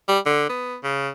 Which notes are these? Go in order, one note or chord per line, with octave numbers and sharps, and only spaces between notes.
G3
D3
B3
C#3